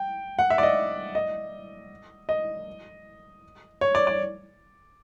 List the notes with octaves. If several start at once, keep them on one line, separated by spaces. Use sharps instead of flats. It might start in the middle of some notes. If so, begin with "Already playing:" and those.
Already playing: G5
F#5
E5
D5
D#5
D#5
D#5
C#5
D5
D5